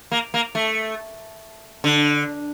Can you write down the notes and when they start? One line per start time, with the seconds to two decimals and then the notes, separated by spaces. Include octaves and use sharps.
0.12 A#3
0.34 A#3
0.55 A3
1.84 D3